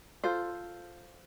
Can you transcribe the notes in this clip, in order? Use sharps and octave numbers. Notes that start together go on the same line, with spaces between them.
F4 A4 C5